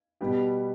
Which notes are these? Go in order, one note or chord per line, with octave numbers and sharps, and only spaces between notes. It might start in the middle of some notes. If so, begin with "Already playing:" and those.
B2 G3 B3 G4